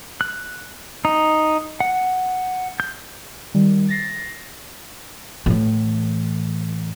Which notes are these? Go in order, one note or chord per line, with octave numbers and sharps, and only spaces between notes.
F#6
D#4
F#5
G6
D#3 G3
A6 A#6 C7
A2 E3